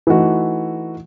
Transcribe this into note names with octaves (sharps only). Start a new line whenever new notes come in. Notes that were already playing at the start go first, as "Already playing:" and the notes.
E3 A3 D#4 F#4